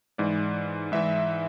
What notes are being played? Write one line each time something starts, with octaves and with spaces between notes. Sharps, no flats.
G#2 E3 D5
G#2 E3 E5